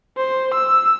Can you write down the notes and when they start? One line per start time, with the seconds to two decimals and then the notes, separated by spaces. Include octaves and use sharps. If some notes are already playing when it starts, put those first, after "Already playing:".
0.18 C5
0.54 E6